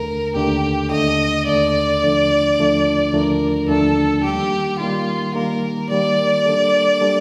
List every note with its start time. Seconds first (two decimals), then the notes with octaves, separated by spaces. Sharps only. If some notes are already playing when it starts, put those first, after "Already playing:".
Already playing: D#2 D3 A3 A#4
0.36 D#2 D3 A3 G4
0.91 D#2 D3 A3 D#5
1.47 D#2 D3 A3 D5
2.02 D#2 D3 F3 A3 D4
2.58 D#2 D3 F3 A3 D4
3.13 D#2 D3 F3 A3 D4 A#4
3.68 D#2 D3 F3 A3 D4 A4
4.24 D#3 G3 A#3 G4
4.79 D#3 G3 A#3 F4
5.35 D#3 G3 A#3 A#4
5.90 D#3 G3 A#3 D5
6.46 G3 A#3 D4 A4
7.01 G3 A#3 D4 A4